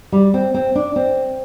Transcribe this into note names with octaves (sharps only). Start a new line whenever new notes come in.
G3
C4
C4
D4
C4